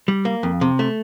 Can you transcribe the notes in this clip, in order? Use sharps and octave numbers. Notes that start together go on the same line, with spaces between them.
G3
A#3
F2
C3
A3